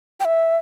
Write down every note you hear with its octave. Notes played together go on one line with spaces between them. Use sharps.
G5
E5